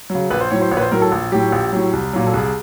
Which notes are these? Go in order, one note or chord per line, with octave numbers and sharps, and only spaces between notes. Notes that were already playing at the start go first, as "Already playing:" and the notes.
F#3
C#3
A#1 B4
C5
A2 F#3 C#5
C5
A#1 C#5
B4
C5
A2 F#3 A#4
A4
A#1
A2 F#3 G4
A#1
A2 F#3
C2
A#2 F#3
A4
C2 G#4